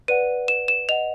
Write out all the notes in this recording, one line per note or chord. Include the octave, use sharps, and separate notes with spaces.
B4 D5 F#5 D#7
B4 E7
E7
D#5 F#5 F7